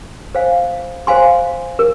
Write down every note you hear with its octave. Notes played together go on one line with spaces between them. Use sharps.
C5 F5 G#5
C5 F5 G#5 C6
A#4